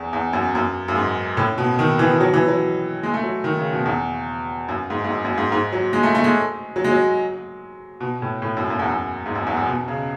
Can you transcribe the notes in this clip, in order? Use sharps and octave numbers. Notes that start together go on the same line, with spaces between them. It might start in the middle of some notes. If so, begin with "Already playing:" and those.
Already playing: E2
E2
F#2
F#2
F#2
G#2
A2
B2
D#3
E3
F#3
E3
F#3
G#3
A3
F#3
D#3
C#3
B2
E2
F#2
G#2
G#2
F#2
F#2
G#2
G#2
F#3
G#3
A3
A3
G#3
F#3
G#3
F#3
B2
A2
A2
F#2
F#2
E2
F#2
G#2
F#2
E2
F#2
B2
C#3